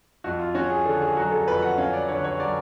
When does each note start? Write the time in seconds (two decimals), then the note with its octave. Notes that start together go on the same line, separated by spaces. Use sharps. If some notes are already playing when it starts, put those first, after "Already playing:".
0.24 F2 F#4
0.39 F4
0.55 C#4 F#4
0.70 G#4
0.86 D3 A4
1.01 G#4
1.16 F#3 F#4
1.32 A4
1.48 F2 B4
1.62 F#5
1.78 C#4 F5
1.93 D5
2.09 D3 C#5
2.24 C#5
2.40 F#3 D5